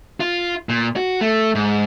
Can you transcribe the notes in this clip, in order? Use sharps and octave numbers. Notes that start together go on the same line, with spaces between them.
F4
A#2
F#4
A3
G#2